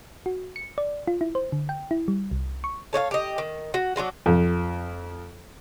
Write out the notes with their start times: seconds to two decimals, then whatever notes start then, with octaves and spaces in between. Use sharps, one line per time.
0.26 F#4
0.56 C#7
0.78 D5
1.08 F4
1.21 E4
1.35 C5
1.52 D3
1.69 G5
1.91 E4
2.08 G3
2.31 C2
2.64 C#6
2.93 A4 C#5 D5 F5
3.11 G4 D#5
3.38 D#3
3.74 F#4
3.96 F#3 D4 F4 F#4
4.26 F2